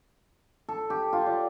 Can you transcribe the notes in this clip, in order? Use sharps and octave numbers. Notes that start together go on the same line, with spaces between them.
A4
G4
F4
D5